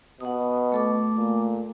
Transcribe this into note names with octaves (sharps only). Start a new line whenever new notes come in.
B2 F#5 D#6
A3 A4 D6
A#2